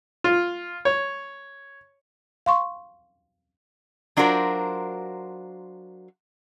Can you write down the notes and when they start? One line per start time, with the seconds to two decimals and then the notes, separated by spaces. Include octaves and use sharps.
0.24 F4
0.85 C#5
2.46 F5 C6 C#6
4.17 F#3 D4 F4 F#4 A#4 C5